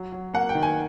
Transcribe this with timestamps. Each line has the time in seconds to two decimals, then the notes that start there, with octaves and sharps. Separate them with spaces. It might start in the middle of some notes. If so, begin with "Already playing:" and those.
Already playing: F#3
0.12 F#3
0.34 A#3 F#5
0.49 G5
0.55 D#3
0.63 G#5